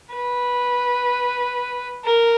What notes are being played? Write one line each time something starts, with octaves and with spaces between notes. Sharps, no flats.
B4
A#4